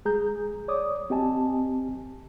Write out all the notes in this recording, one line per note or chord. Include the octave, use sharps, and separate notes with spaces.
G#3 G#4 A#5 G6
C#5 D5 D6 D#6
C4 G4 D#5 G#5 A5